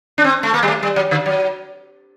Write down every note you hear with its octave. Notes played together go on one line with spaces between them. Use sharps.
D4
C4
A3
A#3
G3
A3
G3
F#3
D3
F#3